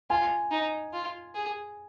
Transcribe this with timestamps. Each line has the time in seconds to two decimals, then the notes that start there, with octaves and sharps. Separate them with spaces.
0.10 F4 G#5
0.51 D#4
0.93 F4
1.35 G#4